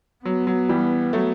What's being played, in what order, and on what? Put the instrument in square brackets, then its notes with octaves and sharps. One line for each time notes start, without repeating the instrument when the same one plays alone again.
[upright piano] F#3 [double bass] B3
[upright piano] F#3
E3 G3
F#3 A3